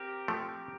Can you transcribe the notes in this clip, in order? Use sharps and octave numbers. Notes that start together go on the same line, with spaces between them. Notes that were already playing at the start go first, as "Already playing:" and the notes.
Already playing: C4 G4 A#4
F3 A3